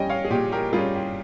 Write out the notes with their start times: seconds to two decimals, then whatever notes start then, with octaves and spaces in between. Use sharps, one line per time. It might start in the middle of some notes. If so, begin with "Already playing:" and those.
Already playing: G3 C#4 D#5 G5 G#5
0.10 C#5 F5
0.25 G#4
0.30 A#2 G4
0.52 G4 A#4
0.73 G3 C#4 F4 G#4
0.95 G4